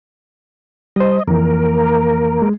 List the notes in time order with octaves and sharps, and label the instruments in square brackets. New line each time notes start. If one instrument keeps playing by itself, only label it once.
[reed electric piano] G3 C5 [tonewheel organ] D#5
[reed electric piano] F2 E3 [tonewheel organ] A#3 A#4
[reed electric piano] G#3